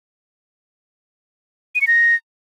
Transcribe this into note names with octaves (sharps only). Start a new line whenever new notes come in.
D#7
C#7
A#6